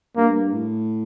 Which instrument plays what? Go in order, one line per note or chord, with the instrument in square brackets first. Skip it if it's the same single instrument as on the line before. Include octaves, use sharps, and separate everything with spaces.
[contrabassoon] G2 [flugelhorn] A#3
[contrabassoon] A2